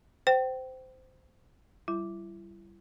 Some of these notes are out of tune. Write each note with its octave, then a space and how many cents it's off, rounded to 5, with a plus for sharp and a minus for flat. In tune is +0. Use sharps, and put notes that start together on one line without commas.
C5 -15 G5 -25
G3 -20 E4 +35